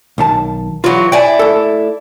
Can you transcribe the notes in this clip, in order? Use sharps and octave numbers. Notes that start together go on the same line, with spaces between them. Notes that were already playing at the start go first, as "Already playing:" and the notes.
B1 D#3 A5
E3 F#3 F4
E4 D5 G5 G#5
A3 A4